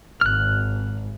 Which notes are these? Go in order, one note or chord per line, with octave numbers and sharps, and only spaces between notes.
G#1 F6 F#6